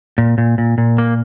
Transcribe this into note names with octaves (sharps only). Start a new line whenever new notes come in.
A#2
A#2
A#2
A#2
A#3